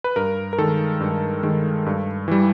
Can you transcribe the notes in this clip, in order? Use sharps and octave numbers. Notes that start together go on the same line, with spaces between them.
B4
G2 A#4
A#4
D#3 G#3 A4
G2
D#3 G#3
G2
E3 G3